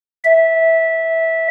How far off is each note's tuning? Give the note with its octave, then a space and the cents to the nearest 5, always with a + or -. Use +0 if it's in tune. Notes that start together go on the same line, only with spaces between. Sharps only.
E5 -15